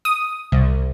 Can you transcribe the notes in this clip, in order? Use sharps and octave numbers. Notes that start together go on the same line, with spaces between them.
D#6
C2